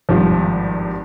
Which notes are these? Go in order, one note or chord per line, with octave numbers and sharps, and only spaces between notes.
G#1 G2 F3